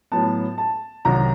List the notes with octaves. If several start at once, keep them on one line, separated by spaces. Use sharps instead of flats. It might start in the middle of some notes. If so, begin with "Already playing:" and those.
A2 F#3 B3 A5
A5
C2 C3 D#3 F#3 A#5